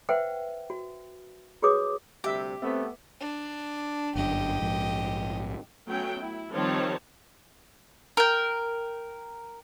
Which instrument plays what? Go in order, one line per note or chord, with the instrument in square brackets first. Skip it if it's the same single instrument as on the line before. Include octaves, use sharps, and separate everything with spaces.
[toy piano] B4 C5 E5 F#5 G5
F#4
F#4 G#4 B4 C#5 D6 D#6
[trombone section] D2 C3 G3 [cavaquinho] G4 [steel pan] E5 D6
[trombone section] A3 B3 [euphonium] C4 [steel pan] B4 E5
[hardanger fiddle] D4
[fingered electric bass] G1 F#2 D4 [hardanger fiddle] G4 D#5
[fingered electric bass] A#1 G#2 F3
[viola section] F#3 A3 B3 C#4 G5
E4
D#3 F3 G3 C4 C#5 A5
[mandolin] A#4 G5